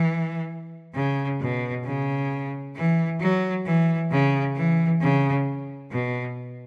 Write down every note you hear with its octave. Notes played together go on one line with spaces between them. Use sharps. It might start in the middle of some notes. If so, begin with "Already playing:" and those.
Already playing: E3
C#3
B2
C#3
E3
F#3
E3
C#3
E3
C#3
B2